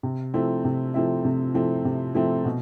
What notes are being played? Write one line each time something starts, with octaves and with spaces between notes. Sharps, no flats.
C3
F3 A3 C4 E4
C3
F3 A3 C4 E4
C3
F3 A3 C4 E4
C3
F3 A3 C4 E4
B2